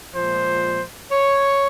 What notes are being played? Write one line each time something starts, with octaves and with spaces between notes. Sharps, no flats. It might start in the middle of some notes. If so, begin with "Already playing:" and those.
A#2 F3 G#3 C5
C#5